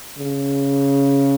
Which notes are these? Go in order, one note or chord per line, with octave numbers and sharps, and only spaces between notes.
C#3